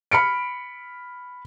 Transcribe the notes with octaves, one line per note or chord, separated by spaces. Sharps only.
B5 F6 C#7 D7